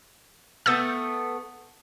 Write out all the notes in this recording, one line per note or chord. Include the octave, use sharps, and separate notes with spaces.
A3 B3 E6 G6 A6